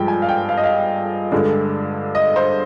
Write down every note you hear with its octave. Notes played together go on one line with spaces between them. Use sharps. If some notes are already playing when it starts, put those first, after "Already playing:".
Already playing: G2 F3 G#3 G5
G#5
F5
G5
F5
D#5
F5
G2 D3 G#3
D#5
C5